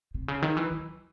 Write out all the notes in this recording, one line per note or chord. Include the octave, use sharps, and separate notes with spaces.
C3
C#3
D#3
E3
F#3